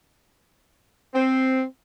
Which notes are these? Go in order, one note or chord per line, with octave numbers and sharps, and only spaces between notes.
C4